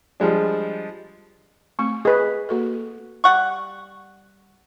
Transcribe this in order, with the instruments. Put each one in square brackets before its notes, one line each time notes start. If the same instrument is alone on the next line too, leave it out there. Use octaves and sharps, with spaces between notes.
[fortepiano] F3 G3 G#3 D4
[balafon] A3 C4 [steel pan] C#6
[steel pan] G#4 B4 [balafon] D#5
[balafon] A#3 F#4 A4
[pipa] G3 F#5 C#6